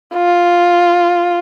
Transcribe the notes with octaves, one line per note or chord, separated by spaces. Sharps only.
F4